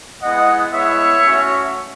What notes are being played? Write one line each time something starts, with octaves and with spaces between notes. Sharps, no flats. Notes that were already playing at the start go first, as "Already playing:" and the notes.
G#3 B3 E4 D#5 F#5
G#3 B3 E4 C#5 E5
A3 C#4 F#4